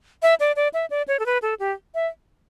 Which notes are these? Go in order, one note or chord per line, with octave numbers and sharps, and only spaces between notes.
E5
D5
D5
E5
D5
C#5
A4
B4
A4
G4
E5